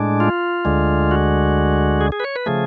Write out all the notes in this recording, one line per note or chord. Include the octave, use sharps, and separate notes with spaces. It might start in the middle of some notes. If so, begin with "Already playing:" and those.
Already playing: A2 G#3 D4
F4
D2 D3 G#3
F#4
G#4
G#4
B4
C#5
B4
C#3 F3 A3 G#4